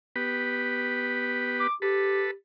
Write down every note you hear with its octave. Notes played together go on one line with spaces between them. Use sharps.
B3 G4 B4
D6
G4 A4 B4